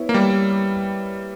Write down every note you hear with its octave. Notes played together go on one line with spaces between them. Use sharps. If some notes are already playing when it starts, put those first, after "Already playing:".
Already playing: B3 E4 C#5
A#3
G3